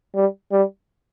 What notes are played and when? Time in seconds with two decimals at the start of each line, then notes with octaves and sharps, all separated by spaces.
0.15 G3
0.52 G3